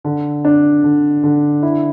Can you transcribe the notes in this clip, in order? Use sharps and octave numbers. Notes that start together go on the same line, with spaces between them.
D3
D4
D3
D3
E4